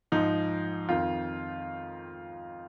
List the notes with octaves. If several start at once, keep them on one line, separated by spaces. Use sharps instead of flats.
G#2 F3 D#4
F2 D#3 F4